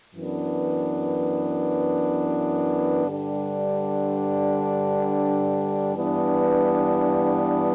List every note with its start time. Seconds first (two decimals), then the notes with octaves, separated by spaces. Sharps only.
0.16 F#2 E3 B3 D4
3.05 G2 D3 G3 D4
5.95 G2 E3 B3 D4